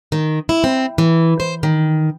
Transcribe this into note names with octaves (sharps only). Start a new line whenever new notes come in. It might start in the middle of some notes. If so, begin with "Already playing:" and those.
D#3
E4
C4
E3
C5
D#3